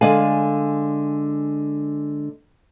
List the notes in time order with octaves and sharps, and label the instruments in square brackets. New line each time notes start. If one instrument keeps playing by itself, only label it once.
[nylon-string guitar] D3 G#3 D5 F5 G#5